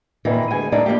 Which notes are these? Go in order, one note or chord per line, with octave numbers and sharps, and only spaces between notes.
F2 A#2 D#3 E3
D2 G#3 G#5
G3 A3 A#3 D4 D#4
F3 G3 A3 A#3 G4